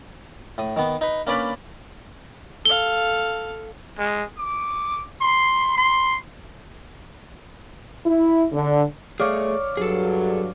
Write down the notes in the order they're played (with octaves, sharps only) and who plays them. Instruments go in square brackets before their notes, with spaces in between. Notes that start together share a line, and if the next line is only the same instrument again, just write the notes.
[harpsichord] A2 D#6
D#3 B3
D#4 B4
A#3 C#4 D4 B4 D5 B5
[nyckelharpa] A4 F5 [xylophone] G7
[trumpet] G#3
D6
C6
C6
[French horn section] E4
D3
[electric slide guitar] A3 G#4 [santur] C#5 D5 F5
[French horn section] G2 F#3 [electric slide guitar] G#4 A4